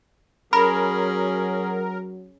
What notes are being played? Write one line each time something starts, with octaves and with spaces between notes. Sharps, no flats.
F#3 C#4 G#4 A#4 B5